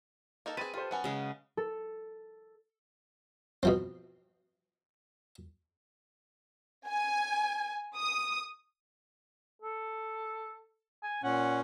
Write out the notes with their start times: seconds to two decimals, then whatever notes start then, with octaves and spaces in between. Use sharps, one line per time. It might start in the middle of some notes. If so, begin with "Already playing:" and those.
0.46 A#3 D#4 A4
0.57 C4 G#4 B4 A6 D#7
0.74 F4 G4 A4 C5
0.91 F#3 B3 C#4 F#5 G#5
1.04 C#3 G#3
1.57 A4
3.63 B2 F3 C4
6.87 G#5
7.96 D#6
9.62 A4
11.03 G#5
11.23 A#2 C#4 F#5